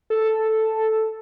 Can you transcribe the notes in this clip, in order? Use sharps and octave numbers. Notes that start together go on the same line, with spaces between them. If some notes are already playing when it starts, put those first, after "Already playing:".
A4